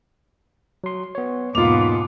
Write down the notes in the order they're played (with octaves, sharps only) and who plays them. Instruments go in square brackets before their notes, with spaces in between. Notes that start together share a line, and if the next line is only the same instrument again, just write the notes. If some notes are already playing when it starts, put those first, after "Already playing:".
[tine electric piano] F#3 C6
B3 C#5
[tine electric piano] E2 A#3 D#4 [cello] G#2 B2 [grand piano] F4 F7 [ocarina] D6